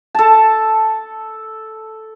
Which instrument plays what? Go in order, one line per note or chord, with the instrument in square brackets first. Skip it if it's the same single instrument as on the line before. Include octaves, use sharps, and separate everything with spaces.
[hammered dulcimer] A4 A5